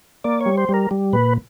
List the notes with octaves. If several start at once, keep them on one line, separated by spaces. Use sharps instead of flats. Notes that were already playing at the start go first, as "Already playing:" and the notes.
A#3 D5
C#5
G3
C5
G3
A#4
G3
A#2 B4